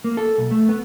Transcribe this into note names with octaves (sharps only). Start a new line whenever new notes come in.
A#3
A4
B1
A3
B3